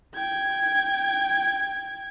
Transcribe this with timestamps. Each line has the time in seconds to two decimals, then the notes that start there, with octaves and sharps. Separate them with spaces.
0.15 G5 G#6